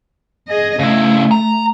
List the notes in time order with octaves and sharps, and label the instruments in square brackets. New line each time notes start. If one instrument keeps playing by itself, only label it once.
[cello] G#4 D#5
[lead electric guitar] C#3 E4 [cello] A3
[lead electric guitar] A#5